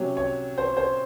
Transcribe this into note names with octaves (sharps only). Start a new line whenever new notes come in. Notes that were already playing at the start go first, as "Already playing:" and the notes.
Already playing: C3 F#3 C#4 C#5
C#5
C5
C5